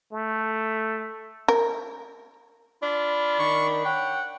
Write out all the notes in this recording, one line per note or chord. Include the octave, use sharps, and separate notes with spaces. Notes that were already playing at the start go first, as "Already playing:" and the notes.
A3
A#4
D4 F4 B5
D#3 C#6
C#5 F#5 G5